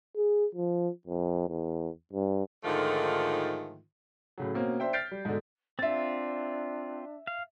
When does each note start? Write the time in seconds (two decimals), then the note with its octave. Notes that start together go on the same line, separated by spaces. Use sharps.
0.17 G#4
0.55 F3
1.07 F2
1.48 E2
2.13 G2
2.64 G#2 D3 D#3 F3 A3 F4
4.38 A2 C#3 F#3
4.54 B2 A#3 C4 C#4
4.80 D4 C5 E5 G5
4.93 F6 G6 A6 B6 C7 D7
5.11 G3
5.25 G#2 B2 D3
5.79 C4 D4 F4 E5 A6
7.27 F5